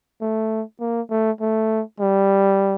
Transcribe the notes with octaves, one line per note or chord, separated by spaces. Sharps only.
A3
A#3
A3
A3
G3